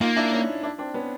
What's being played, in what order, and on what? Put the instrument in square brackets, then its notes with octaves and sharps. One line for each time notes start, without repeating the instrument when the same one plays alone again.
[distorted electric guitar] A#3 [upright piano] D#4 F4
[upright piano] D4 E4
C#4 D#4
D4 E4
C4 D4
B3 C#4